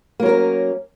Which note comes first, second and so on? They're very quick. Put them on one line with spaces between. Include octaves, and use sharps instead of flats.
A#3 F#3 A#4 C#4